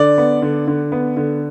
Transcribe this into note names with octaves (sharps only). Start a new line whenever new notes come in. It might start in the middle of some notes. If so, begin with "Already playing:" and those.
Already playing: D3 D5
B3
D3
D3
B3
D3